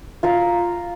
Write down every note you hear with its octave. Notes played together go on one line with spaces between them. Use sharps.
F4 F5 A#5